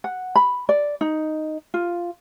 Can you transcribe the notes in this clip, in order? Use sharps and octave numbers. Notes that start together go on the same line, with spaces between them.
F#5
B5
D5
D#4
F4